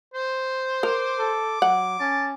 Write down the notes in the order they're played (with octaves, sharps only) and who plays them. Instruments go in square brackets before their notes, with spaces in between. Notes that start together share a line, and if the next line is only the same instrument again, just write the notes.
[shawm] C5
[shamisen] A#4 [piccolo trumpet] D6
[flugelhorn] A4
[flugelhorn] F#3 [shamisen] F#5
[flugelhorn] C#4 [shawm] A5